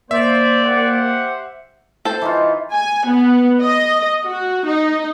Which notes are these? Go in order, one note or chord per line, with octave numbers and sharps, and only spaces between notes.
A#3 C5 D5 E5
G4 C5 F#5
A4 C5
E3 D#4 F4
G#5
B3
D#5
F#4
D#4